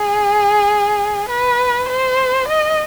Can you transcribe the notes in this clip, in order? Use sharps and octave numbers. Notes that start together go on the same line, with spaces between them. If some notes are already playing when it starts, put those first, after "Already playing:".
Already playing: G#4
B4
C5
D#5